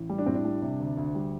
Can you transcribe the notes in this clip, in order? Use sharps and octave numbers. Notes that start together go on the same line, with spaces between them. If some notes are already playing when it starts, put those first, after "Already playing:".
Already playing: A1
G3
D4
A2 C4
D4
G3
C3
D2
D2
G3